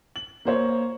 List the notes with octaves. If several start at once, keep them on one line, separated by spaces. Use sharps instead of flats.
F#7
A#3 C5 C#5